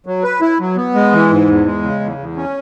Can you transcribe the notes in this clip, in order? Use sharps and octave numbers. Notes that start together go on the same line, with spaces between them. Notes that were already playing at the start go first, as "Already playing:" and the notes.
F#3
B4
E4
F#3
B3
G#3
E3
G#2
E2
G#3
C#3
E2
E2
C#4